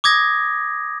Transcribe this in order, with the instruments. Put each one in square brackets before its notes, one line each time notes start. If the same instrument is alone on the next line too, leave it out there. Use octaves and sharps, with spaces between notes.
[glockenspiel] D6 D#6 G#6 A#6